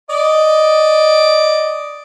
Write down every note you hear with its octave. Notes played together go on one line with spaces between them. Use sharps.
D5 D#5